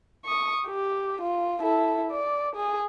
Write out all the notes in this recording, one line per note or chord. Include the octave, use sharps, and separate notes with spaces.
C#6 D#6
G4
F4
E4 A4
D5
G#4